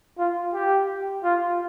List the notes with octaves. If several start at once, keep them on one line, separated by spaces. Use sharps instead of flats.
F4
G4
F4